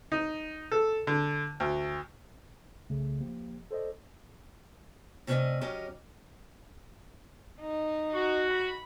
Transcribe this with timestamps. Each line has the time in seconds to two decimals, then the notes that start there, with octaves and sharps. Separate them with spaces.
0.12 D#4
0.72 A4
1.07 D3
1.60 D2
2.90 C2 C#3 A3
3.20 F3 A#3 G4
3.71 A4 C5 D5 D#5
5.27 C3 A3 C#4 B4 D5 D#5
5.61 F#3 C#4 G4 A#4 D#5
7.61 D#4
8.14 F#4
8.51 B5